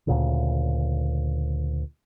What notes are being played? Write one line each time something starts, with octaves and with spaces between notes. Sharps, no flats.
D2 A#2 C#3